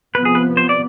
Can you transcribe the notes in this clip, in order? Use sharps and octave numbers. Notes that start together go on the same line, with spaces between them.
C3 F3 B3 B4
G#4
B4
C5
D5